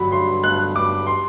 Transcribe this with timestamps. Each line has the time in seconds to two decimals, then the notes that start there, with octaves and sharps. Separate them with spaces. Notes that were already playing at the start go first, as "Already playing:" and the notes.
Already playing: G1 G2 F#3 B5
0.12 G2 C6
0.44 G2 F#6
0.75 G2 D6
1.07 C6